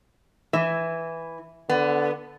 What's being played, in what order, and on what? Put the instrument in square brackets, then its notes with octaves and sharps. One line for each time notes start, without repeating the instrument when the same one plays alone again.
[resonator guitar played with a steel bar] E3 [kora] E5
[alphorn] D3 [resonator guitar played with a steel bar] B3